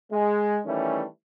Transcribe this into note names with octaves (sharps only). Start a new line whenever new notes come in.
G#3
D#3 E3 G3 A3 C#4